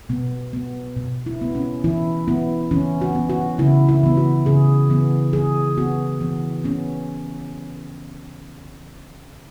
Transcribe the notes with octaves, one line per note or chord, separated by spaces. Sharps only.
B2 B3
B3
B2
E4
B3
C#4
E3 E4
B3 E4
E3 C#4
F#4
B3
F#4
C#3 E4
E4
E3 B3
F#4
C#3 G#4
E3 B3
E3 G#4
B3 F#4
E3 B3
B3 C#4